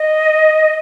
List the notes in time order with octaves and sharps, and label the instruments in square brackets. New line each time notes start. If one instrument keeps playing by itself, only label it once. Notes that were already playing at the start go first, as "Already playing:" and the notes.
Already playing: [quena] D#5